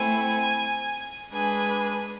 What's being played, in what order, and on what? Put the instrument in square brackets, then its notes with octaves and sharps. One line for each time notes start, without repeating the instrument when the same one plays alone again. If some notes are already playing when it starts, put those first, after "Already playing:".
Already playing: [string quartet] A3 C4 E4 [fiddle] G#5
[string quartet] G#3 D4 G#4 B4 [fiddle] G#5